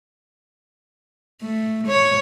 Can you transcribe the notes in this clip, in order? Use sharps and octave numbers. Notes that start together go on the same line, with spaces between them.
A3
C#5